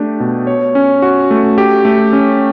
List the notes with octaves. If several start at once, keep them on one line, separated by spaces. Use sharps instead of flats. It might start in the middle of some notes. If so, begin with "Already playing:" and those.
Already playing: A3 D4 G4
B2
C#5
C#4
F#4
A3
G4
A3
C#4